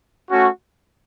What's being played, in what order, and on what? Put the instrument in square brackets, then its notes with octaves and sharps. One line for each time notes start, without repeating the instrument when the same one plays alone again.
[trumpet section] A3 C#4 F#4